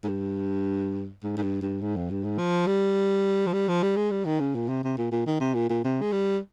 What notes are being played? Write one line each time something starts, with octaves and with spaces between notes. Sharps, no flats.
G#2
G2
G#2
G#2
G2
G2
G#2
F2
G2
G#2
F3
G3
F3
G3
F3
G3
G#3
G3
D#3
C#3
A#2
C3
C3
A#2
A#2
D#3
C3
A#2
A#2
C3
G#3
G3